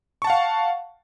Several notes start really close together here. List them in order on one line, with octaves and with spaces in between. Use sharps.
C#6 A5 F#5 F5